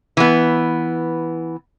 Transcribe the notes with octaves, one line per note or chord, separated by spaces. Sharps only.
E3 B3